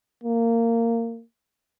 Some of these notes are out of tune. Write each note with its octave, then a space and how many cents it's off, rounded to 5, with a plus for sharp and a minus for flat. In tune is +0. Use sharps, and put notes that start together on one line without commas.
A#3 -20